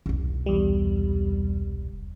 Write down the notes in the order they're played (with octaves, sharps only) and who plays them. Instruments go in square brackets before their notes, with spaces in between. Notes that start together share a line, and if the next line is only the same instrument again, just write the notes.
[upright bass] E1 C2
[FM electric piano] E2 G3